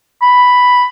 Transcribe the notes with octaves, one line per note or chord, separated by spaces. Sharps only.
B5